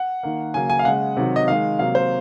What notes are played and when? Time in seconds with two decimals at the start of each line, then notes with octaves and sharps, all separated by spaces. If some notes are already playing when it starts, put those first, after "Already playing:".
Already playing: F#5
0.23 D#3 A#3
0.54 C#3 F#3 A#3 G#5
0.70 G#5
0.79 F5
0.85 C#3 G#3 F#5
1.17 C3 D#3 F#3
1.36 D#5
1.48 D#3 G#3 F5
1.79 C3 F#3 A#3 F5
1.95 C5